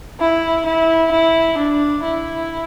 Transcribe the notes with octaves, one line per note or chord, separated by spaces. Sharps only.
E4
E4
E4
D4
E4